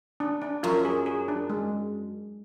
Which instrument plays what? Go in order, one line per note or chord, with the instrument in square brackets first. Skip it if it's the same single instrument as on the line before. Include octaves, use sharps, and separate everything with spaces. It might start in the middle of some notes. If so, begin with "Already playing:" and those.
[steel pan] D4
D4
[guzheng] F#2 [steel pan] F4
[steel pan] G#4
G#4
D4
G#3